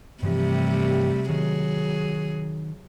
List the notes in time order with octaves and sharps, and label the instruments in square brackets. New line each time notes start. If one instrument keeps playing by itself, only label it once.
[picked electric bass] G2 E3 F3 [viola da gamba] C3 G3 A3
[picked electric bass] D#3 [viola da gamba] F#3 G#4